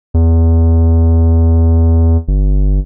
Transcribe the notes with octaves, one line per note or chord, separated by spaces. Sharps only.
E2
G1